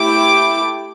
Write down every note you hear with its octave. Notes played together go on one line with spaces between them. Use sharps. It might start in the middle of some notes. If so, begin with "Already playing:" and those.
Already playing: A3 E4 G4 D6